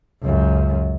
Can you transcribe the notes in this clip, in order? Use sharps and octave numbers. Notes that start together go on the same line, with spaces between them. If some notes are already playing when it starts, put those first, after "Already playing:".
C#2 F#2